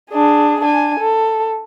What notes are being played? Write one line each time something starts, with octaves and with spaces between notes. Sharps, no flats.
D4 G#4
D4 G#5
A4